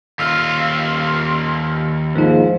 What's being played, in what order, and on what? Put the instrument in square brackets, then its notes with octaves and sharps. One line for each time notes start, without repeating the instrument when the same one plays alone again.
[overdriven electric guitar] D#2 F4 [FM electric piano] E6 F6
[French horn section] G#2 F3 [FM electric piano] A#3 D#4